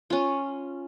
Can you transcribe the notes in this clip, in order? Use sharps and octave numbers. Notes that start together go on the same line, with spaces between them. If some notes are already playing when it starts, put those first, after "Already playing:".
C#4 F4